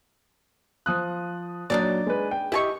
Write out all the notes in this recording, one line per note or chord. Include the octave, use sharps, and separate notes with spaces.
F3 D#6 F#6
A#2 F#3 D4 D#4 D5
G#3 B4
G5
E4 G4 D#5 G#5 C#6